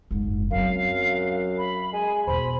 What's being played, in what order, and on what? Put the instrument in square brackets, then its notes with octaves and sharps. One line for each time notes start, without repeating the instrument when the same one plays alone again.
[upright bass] F#1 G#2
[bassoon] F#2 [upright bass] F#3 C4 [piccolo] F5
[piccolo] B5
[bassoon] G#3 [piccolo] G#5
[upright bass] E2 B2 [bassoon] C5 [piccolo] B5